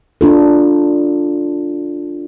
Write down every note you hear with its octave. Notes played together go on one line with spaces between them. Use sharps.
D4 F4 A4